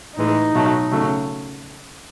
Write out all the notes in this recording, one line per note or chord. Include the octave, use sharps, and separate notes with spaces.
A2 E3 G#3 D#4
B2 F#3 A3
C#3 F#3 A3